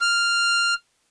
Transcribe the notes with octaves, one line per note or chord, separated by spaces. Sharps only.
F6